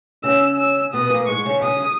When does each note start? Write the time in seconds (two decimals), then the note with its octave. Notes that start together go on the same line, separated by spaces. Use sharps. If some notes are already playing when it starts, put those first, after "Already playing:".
0.24 C#3 C#4 E6
0.59 E6
0.93 B2 B3 D#6
1.10 A#2 A#3
1.28 G#2 G#3 C#6
1.45 C#3 C#4
1.62 C#3 C#4 D#6